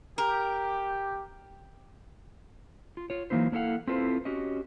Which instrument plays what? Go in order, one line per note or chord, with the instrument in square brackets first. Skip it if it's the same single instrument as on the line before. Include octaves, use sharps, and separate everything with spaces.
[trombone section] G4 [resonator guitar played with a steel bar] A#4
[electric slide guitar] F4
F4 C#5
E3 F#3 A#3 D#4 E4 C5
A#3 D4 E4 A4 F5 F#5
C4 E4 F4 A4 B4 C5
C#4 F#4 G4 D#5